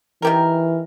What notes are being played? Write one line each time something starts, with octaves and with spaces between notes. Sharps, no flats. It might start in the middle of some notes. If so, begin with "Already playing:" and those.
D#3 E3 G4 A#4